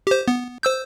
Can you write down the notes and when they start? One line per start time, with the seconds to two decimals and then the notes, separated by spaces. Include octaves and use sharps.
0.07 G4 C5
0.28 B3
0.63 C5 E6 G6